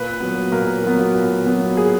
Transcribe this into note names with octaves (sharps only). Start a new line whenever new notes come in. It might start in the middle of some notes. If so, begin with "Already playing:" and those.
Already playing: A#2 B4
F#3 B3
A#2 A#4
F#3 B3
A#2
F#3 B3
A#2 G#4